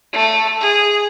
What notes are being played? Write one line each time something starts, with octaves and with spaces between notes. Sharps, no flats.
A3
G#4